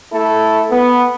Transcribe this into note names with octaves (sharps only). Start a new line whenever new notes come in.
A3 E4 A4
B3